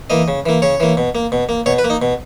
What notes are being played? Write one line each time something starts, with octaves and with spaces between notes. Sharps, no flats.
E3 A#3 D#5
C#3
E3 A#3
C#3 C#5
E3 A#3
B2
A#3
B2
A#3
B2 C#5
B4
A#3
D#4
B2